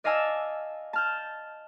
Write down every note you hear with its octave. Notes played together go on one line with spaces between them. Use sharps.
D5 D#5 F5 G#5 A5 E6
A5 F6 G6